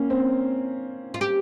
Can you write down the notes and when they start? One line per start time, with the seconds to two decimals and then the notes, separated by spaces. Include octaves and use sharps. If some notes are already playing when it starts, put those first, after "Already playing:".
Already playing: A#3 C#4
0.10 C4
1.14 F4
1.21 G4